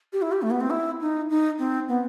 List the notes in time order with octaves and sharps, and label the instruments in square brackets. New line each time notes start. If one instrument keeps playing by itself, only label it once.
[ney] G4
E4
G4
A3
B3
C4
E4
D#4
D#4
C4
B3